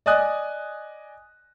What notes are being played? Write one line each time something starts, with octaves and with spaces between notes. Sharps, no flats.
D5 D#5 G#5 D#6 F#6